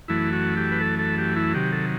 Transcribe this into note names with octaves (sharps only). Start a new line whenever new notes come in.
F#2 E3 A3 E4
F#4
G4
B4
A4
A4
G4
E4
C3 D#3 F#3 G4
A4